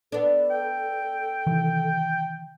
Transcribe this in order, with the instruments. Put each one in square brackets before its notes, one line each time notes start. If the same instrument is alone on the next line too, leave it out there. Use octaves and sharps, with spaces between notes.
[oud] B3 D4 [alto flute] A4
[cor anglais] G5
[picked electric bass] C3 D#3 E3